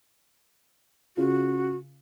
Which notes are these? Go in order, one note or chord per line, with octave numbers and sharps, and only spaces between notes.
C#3 F4 F#4